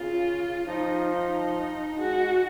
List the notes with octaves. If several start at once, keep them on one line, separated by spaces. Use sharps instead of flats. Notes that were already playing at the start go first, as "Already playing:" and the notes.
Already playing: C#3 F4
F3 D#4
D#4
G#3 F#4